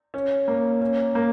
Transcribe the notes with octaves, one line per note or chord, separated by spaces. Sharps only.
C#4
A#3
C#4
A#3